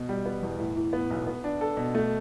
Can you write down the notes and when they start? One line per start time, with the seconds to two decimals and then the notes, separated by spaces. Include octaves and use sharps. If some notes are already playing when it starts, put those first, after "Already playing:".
Already playing: B2
0.09 G3
0.26 B3
0.43 E2
0.59 A2
0.76 E3
0.93 B3
1.10 B1
1.27 B3
1.44 D4
1.61 A4
1.77 B2
1.94 A3